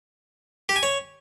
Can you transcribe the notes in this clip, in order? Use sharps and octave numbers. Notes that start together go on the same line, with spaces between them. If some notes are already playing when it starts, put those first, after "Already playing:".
G4
G#5
C#5